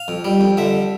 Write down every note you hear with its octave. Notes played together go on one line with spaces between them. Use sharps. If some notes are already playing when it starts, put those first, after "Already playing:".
Already playing: F5
F2
G3
F2
D3 E5